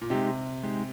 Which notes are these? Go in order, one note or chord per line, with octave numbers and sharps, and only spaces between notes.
A#2
C3 G#3 D#4 G4
G#3 D#4 G4